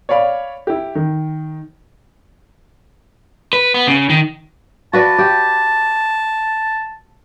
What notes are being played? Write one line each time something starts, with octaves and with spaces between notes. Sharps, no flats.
C#5 D5 F5 B5
E4 G4
D#3
B4
B3
C#3
D#3
F#4 B4 D5 A5
G4